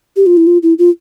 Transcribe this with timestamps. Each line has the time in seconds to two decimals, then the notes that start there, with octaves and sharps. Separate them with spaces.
0.16 G4
0.26 F4
0.37 E4
0.47 F4
0.63 E4
0.79 F4